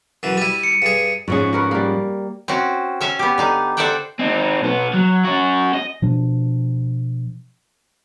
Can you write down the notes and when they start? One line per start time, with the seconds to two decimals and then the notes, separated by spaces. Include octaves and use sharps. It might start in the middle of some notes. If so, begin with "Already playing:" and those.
0.23 F#2 E3
0.38 G3 E4 D#7
0.64 C#7
0.82 G2 G#4
1.28 G#2 F3 C#4 F#4 G#4
1.53 F#4 A#4 B4
1.71 G3 A#3
2.48 C4 C#4 F#4
3.01 C#4 E5 F5
3.19 B3 G4
3.38 D3 D#4 F5
3.77 A4 C5 D5 E5 F#5 G5
4.19 C4 D#4
4.61 B1 B3
4.93 F#3
5.25 C#4 F#4
5.73 D#5
6.02 B2 F3 D4